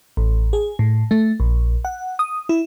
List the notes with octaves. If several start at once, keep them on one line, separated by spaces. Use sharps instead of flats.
A1
G#4
A2
A3
A#1
F#5
D#6
E4